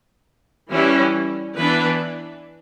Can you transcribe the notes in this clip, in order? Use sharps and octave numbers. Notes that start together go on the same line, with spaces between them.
E3 G3 C#4 E4
E3 B3 D4 B4